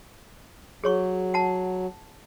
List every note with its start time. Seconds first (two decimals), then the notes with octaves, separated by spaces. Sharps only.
0.84 F#3 G#4 C#5 C#6
1.34 F#5 A5